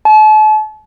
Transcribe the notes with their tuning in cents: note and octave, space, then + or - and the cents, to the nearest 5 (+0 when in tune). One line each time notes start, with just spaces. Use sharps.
A5 -40